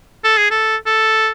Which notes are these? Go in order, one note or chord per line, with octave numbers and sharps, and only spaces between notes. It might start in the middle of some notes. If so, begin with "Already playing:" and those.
A4
G#4
A4
A4